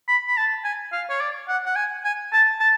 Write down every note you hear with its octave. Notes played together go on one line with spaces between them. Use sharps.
B5
B5
A5
G#5
F5
C#5
D5
F#5
F#5
G#5
G#5
A5
A5